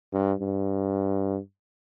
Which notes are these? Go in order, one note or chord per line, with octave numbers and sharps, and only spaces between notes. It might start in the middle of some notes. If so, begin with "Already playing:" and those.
G2
G2